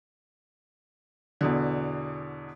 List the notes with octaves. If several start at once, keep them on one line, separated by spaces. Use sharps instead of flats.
E2 B2 D3